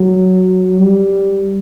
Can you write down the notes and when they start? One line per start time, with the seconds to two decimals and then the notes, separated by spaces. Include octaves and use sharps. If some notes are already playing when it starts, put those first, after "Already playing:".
Already playing: F#3
0.80 G3